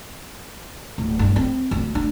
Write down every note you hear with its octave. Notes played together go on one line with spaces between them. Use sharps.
D1
G2
C4
D2
D4